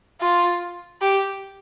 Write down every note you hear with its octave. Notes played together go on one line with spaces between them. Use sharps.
F4
G4